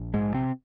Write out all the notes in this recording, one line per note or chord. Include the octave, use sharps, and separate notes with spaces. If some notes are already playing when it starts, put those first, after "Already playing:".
Already playing: A#1
G#2 G#3
C3 C4